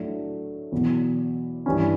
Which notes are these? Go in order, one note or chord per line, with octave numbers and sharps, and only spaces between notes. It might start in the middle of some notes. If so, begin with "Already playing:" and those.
Already playing: A2 F#3 A3 D4
E2 B2 F#3
G2 E3 G3 C#4